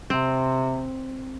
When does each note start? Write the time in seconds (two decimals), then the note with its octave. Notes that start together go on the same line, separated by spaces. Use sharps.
0.10 C3 C4